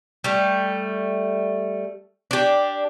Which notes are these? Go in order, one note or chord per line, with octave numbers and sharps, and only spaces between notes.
G3 A3
D4 G4